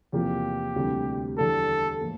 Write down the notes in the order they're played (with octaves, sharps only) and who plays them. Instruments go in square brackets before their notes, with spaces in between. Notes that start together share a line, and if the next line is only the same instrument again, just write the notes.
[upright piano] E2 C3 F3 A#3 [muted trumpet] G4
[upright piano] D2 C3 E3 G3
[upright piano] E2 D3 G3 [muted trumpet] A4
[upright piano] A2 E3 A#3